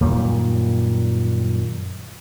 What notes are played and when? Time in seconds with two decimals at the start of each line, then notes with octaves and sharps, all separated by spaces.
0.01 F#2 A#2 D#3 G3